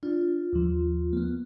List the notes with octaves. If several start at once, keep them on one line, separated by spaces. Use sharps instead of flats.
D4 F4
D#2 F3
A#3 B3